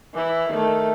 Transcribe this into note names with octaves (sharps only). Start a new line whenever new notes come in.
E3 E4
D#3 A3